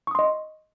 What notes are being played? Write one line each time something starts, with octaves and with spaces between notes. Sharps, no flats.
D#5 C6 C#6 D#6